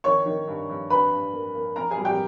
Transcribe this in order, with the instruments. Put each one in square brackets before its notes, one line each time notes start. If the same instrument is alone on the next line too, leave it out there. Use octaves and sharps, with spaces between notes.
[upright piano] D#3 C#5 C#6
D#3
G2
G2
G2 B4 B5
G2
A#3
A#3
A#3 A#4 A#5
G#4 G#5
G3
G4 G5